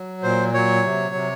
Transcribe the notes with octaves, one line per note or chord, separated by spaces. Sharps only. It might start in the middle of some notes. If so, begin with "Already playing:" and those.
Already playing: F#3
A#2 C5
F#3 C#5
C3
C3